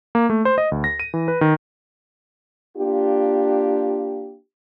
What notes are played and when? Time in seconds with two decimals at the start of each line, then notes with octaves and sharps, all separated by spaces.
0.15 A#3
0.30 A3
0.45 C5
0.58 D#5
0.72 D2
0.84 A#6
1.00 D#7
1.14 E3
1.28 B4
1.41 D#3
2.77 A#3 D4 F4 G4